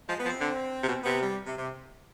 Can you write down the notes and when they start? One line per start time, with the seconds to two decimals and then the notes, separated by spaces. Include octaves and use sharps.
0.09 F3 G#3
0.19 B3
0.25 F3
0.29 C4
0.40 D3
0.83 C3
0.88 B2
1.04 C3 B3
1.21 G3
1.46 C3
1.58 C3